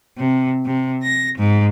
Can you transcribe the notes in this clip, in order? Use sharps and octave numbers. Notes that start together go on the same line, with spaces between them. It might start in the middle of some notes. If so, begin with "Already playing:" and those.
C3
C3
A#6
G#2